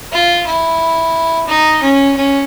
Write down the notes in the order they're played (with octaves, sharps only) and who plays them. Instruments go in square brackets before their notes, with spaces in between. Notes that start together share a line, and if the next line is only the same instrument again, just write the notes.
[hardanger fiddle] F4
E4
D#4
C#4
C#4